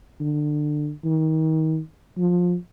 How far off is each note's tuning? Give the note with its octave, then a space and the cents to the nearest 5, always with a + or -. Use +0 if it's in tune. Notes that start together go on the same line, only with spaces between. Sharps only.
D3 +25
D#3 +30
F3 +20